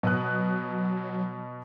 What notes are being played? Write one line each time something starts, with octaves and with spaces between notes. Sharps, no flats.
B2 F#3 D#6 F#6